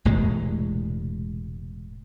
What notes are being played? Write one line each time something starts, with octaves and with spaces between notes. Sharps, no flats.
E1 A2 C3 G#3